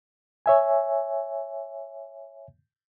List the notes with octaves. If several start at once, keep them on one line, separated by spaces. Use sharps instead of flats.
C#5 E5 G#5